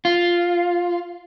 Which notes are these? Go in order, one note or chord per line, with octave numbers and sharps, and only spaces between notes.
F4